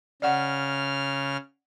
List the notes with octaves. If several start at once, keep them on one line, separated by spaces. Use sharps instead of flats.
C#3 D5 F#5 F6